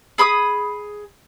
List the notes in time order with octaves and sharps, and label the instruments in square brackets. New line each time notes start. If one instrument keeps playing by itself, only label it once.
[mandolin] G#4 B5 D6 D#6